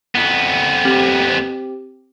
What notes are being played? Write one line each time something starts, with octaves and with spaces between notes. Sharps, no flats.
F2 B3
C4 G4